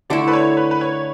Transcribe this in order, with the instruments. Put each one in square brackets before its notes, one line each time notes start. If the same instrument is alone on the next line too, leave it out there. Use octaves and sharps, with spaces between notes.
[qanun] D3 A3 E4 [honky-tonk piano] D5
[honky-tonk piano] B4
C#5
B4
B4
C#5